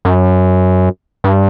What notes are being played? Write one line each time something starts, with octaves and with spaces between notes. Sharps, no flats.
F#2
G2